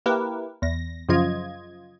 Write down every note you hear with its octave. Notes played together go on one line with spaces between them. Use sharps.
A#3 E4 G4 A#4 B4
E2 A#6
F#2 C#3 F3 F4 D#5 G#6